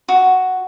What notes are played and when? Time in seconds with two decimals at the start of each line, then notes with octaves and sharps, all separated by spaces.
0.08 F#4